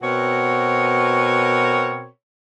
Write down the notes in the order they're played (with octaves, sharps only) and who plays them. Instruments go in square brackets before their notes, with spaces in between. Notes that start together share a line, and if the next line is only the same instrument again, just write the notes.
[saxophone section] B2 C4 F#4 A#4 C#5